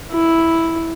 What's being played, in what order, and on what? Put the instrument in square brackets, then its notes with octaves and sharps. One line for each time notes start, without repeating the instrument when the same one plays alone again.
[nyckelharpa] E4